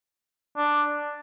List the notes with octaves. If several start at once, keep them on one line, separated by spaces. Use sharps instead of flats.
D4